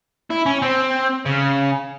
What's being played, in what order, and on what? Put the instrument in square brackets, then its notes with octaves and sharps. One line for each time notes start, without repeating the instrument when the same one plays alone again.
[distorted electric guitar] E4
C#4
C4
C#3